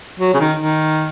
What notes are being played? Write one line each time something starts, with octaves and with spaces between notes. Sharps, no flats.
F#3
C#3
D#3
D#3